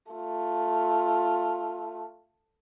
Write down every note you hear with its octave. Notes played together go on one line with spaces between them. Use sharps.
A3 F4